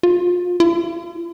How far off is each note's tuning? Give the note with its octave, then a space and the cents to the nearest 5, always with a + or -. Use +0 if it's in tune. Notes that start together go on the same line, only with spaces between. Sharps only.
F4 +30
F4 -45